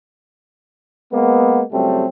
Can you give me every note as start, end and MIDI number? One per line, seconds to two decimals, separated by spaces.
1.13 1.62 56
1.13 1.62 58
1.13 1.62 59
1.72 2.05 37
1.72 2.05 54
1.72 2.05 55
1.72 2.05 57
1.72 2.05 60